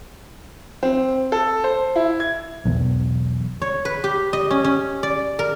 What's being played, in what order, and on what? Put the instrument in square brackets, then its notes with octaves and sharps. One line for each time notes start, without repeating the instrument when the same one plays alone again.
[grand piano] C4
A4
C5
E4
G#6
[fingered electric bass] B1 E2
[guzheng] C#5
B4
G4
D#5
C#4
C#4
D5
A#4